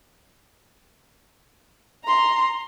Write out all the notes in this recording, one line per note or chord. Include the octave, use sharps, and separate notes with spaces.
A#5 C6